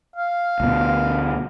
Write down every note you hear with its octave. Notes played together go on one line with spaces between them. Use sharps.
F5
D2 B2